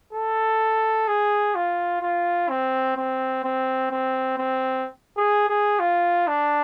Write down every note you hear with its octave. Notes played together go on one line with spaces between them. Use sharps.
A4
G#4
F4
F4
C4
C4
C4
C4
C4
G#4
G#4
F4
D4